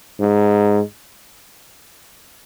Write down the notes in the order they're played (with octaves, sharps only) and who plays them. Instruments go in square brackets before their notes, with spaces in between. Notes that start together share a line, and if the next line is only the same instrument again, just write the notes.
[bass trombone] G#2